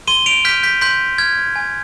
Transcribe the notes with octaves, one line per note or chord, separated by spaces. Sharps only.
C6 D#7 G7
D7 F7
F6 G6 B6
G6 B6
C6 G6 B6
F6 G#6
G#5